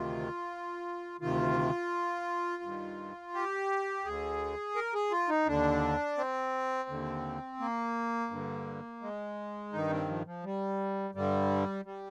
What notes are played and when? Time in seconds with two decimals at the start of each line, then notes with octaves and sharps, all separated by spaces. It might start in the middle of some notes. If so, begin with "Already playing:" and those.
Already playing: D2 C3 D#3 F4
1.21 D2 C3 D#3 F4
2.63 G2 D#3
3.34 G4
4.05 D2 D3 G#4
4.75 A#4
4.94 G#4
5.11 F4
5.29 D#4
5.47 D#2 D3 D4
6.18 C4
6.89 D#2 D3
7.60 A#3
8.31 G2 D3
9.02 G#3
9.73 G2 D#3 D#4
9.90 C4
10.08 F3
10.26 F3
10.44 G3
11.15 G2 D3 G3
11.85 G3